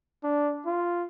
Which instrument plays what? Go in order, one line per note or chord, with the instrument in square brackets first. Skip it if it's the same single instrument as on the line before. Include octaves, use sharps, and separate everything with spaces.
[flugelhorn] D4
F4